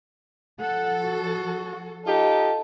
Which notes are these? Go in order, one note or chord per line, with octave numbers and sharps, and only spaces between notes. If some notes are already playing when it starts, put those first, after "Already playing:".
F3 A4 F#5
F#4
D#4 F4 G4 A4